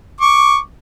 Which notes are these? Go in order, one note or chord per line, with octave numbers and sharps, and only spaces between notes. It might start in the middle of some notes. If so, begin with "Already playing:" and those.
C#6 D6